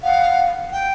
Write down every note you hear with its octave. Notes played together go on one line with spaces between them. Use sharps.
F5 F#5
G5